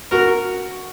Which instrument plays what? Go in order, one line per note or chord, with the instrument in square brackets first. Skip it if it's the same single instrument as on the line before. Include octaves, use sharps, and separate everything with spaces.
[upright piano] F#4 [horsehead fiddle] A#4